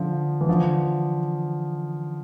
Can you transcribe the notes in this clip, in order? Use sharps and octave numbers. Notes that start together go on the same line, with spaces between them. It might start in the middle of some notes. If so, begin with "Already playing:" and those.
Already playing: D3 F3
E3
D3 F3